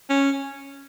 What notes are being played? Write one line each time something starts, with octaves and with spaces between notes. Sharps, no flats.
C#4